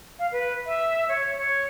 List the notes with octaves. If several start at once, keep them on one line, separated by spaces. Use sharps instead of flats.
F5
B4
E5
C#5
C#5